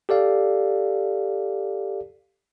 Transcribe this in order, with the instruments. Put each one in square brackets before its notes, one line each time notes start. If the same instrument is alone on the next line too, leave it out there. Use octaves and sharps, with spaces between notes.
[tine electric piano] G4 A4 D5 F5